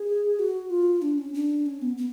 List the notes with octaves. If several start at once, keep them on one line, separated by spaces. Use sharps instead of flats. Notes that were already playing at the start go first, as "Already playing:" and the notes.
Already playing: G#4
F#4
F4
D4
C#4
D4
C#4
B3
B3